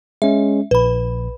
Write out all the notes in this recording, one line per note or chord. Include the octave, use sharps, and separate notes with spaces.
G#3 C#4 E5
A#1 B4 B5